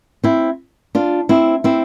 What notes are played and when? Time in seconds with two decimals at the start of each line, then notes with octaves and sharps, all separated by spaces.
0.24 C4 E4
0.95 D4 F4
1.29 C4 E4
1.64 C4 E4